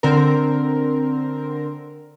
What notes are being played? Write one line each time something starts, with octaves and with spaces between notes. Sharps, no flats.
D3 C4 A#4